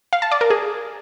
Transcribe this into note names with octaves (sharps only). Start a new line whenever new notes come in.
F5
A5
D5
A#4
G#4